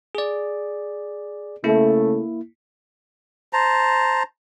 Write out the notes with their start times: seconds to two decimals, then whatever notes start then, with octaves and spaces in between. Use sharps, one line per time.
0.15 G#4 D5
1.64 C#3 A3 A#3 E4
3.53 C5 A5 A#5